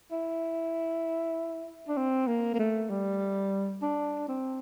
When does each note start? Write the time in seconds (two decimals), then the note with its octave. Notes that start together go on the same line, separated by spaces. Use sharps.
0.12 E4
1.88 D4
1.97 C4
2.27 A#3
2.54 A#3
2.59 A3
2.89 G3
3.82 D4
4.28 C4